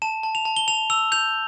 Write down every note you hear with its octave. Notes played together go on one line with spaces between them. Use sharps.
A5 E7
A5
F7
A5
G7
A5 F7
E6 F7
G6 F7